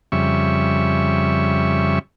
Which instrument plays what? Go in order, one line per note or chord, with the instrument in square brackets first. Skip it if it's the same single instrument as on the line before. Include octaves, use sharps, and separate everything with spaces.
[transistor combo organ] F2 C#3 G3 E5 C#6